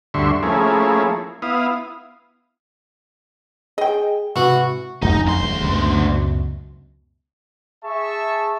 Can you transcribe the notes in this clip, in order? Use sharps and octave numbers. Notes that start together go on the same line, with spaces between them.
D2 G2 D3 E5 C6 C#6
F3 A3 A#3 C#4 E4 G#4
B3 E4 F5 D#6
G#4 D#5 G5
G#2 C3 E3 F#4
A1 F2 D#4
D2 C6
D#1 G#3
C#2 F#2 B2
G#4 E5 A5 C#6